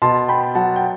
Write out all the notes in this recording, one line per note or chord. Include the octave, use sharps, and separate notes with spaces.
B2 A5 C6
B3 G5 B5
F#3 F#5 A5
G5